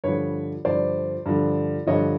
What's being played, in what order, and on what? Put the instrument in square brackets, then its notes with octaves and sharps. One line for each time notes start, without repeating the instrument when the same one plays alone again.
[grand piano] G2 D3 F3 B4 C#5
G2 D3 F3 C5 D5
G2 D3 F3
G2 D3 F3 C#5 D#5